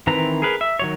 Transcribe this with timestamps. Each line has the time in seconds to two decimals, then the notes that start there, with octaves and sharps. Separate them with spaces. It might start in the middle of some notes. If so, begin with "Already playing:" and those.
0.07 D#3 E3 C4 B4 A#5
0.42 G#4 A#4 B4
0.61 E5
0.79 D#3 F#3 C#5